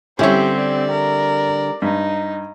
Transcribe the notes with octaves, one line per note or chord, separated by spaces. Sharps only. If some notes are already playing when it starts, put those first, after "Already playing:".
D3 G3 C4 C#4 E4 G4 C#5
D5
A#4
G2 D#4